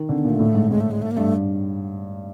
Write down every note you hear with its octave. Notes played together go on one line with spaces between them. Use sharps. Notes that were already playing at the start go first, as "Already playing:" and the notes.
Already playing: D#3
D3 C4
B3
A#2
A3
A2
G#2
A2 G#3
A3
G#3
A3
A#3
G2 A3